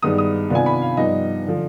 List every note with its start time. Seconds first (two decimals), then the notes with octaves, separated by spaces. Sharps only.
0.02 G2 D#3 G#3 B3 D#4 D#6
0.18 D#6
0.50 C3 D#3 B3 D4 F4 G#5
0.66 B5
0.82 F5
0.97 G2 F3 B3 D#4 D#5
1.47 D3 F3